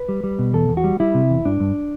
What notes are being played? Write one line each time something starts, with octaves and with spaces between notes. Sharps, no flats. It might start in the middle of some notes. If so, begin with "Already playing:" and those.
Already playing: B4
G3
G3
B2
E2 A4
E2
F#4
G3
G3 E4
C3
E2
G2 D4
G2